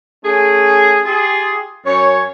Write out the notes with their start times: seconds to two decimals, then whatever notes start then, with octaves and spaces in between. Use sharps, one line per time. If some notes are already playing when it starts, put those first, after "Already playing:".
0.24 A3 C#4 G#4
1.05 F4 G4 G#4
1.86 F#2 C#4 C#5